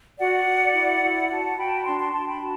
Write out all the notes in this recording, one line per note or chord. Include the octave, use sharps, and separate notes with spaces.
F#4 D5 F#5
F#4
E4
E4
F#4 F#5 A5
F#4 G5 B5
A5
B5
D4 A5 C6
A5 C6
D4 A5 C6
G5 B5
F#4 A5